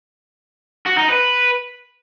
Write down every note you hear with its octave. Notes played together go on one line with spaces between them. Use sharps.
F#4
D#4
B4